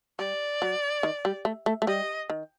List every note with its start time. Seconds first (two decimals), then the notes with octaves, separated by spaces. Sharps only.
0.19 G3 D5
0.62 F#3
1.03 D#3
1.25 G3
1.45 A3
1.66 A3
1.82 A3
1.87 G3 D#5
2.30 D#3